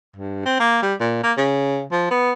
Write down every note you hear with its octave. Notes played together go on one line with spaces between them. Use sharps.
G2
C4
A#3
G3
A#2
A#3
C#3
F3
B3